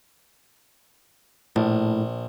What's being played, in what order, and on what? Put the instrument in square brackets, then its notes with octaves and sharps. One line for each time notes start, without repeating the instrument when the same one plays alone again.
[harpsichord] A#1 [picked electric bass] A2